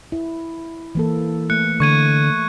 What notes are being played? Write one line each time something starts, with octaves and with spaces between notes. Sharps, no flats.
E4
E3 A#3 A4
A3 F#6 C#7
D3 A3 C#6 G#6 D#7